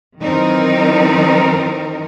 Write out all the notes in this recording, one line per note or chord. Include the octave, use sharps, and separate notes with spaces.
D#3 E3 F#3 C4 D#4 A#4